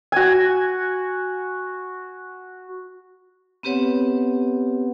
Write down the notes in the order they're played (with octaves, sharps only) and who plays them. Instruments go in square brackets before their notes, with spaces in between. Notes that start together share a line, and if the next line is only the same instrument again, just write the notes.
[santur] F#4 G#5
[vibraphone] B3 C4 G4 B4 C#5 F#5